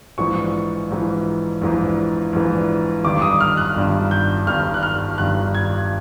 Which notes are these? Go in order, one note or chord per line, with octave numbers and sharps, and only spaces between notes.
A#1 G#2 E3 C#6
A#1 G#2 E3
A#1 G#2 E3
A#1 G#2 E3
G1 G2 D#3 D6
D#6
F6
F#6
G1 G2 D#3
G6
G1 G2 D#3 F6
F#6
F6
G1 G2 D#3 F#6
G#6